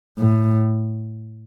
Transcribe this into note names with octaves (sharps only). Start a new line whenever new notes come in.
A2